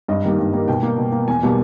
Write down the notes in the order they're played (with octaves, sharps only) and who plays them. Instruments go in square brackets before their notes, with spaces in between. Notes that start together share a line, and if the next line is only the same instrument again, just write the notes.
[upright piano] G2 D#5
D#3 G3 A#3
G2
D#3 G3 A#3
B2 G5
A#3
B2
A#3
E2 G#5
B2 G3 A#3